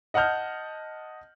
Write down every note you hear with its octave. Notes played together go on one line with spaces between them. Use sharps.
D#5 F#5 A5 F6 G6